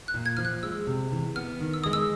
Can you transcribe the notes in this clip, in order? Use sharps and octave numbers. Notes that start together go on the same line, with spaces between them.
F#6
A#2
G#6
F3 F6
F#6
G#3 E6
C3
E3
B3 F6
D#3
E6
G#3 D#6
E6